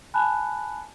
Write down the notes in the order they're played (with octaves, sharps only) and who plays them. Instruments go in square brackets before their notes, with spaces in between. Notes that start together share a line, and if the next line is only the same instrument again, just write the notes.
[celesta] G#5 A5 B5 F#6